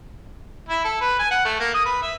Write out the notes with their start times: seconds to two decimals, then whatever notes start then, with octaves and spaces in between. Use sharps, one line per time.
0.69 E4
0.84 A4
1.01 B4
1.19 G#5
1.31 F#5
1.45 A3
1.60 A#3
1.74 D#6
1.85 B4
2.02 E5